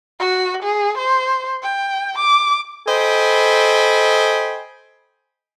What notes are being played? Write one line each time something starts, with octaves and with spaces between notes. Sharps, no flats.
F#4
G#4
C5
G5
D6
A4 C5 D#5 G5 G#5 B5